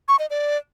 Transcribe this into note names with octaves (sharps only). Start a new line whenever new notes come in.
C#6
D#5
D5